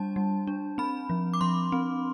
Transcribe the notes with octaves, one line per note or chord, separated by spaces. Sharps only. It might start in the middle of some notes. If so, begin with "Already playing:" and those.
Already playing: G3 D4 A5
G3
D4
C4 B5
F3
D6
F3 C6
C4